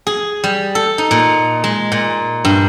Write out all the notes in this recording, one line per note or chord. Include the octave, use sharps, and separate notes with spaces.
G#4
G3
A4
D#4
A#2
G#3
A#2
G2